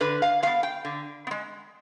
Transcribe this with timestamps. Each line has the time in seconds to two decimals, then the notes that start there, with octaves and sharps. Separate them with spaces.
0.01 D3 B4
0.22 F5
0.43 G#3 B3 F5
0.63 G5
0.85 D3
1.27 B3
1.31 G#3